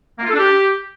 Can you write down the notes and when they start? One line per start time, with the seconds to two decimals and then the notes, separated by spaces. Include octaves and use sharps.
0.18 A#3
0.23 F4
0.28 A4
0.33 D4
0.38 G4